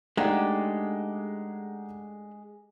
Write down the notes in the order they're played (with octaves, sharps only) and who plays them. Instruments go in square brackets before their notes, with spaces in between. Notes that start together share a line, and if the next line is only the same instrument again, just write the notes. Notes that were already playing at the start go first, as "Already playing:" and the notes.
[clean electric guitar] G#3 [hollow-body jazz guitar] A3 D4 [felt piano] D#4 F#5 A#5 [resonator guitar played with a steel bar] G4